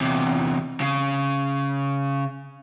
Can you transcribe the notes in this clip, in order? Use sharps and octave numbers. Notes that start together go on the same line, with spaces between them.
E2 C3
C#3